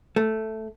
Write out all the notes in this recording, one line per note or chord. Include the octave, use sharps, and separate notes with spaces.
A3